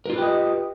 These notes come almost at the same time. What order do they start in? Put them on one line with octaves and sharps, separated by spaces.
A#4 F4 B4 G4 D#5